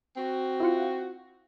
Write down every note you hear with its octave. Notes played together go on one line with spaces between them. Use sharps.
C4 F#4
E4 F4 F#5